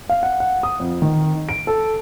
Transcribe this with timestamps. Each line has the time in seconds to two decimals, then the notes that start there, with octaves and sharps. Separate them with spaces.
0.09 F5
0.23 F#5
0.40 F#5
0.63 D#6
0.80 F2
1.02 D#3
1.49 D7
1.67 A4